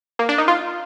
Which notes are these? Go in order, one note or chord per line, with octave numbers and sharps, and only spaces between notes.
A#3
D4
D#4
F4